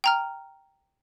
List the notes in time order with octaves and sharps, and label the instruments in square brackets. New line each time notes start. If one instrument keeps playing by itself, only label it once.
[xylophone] G5 A#5 F6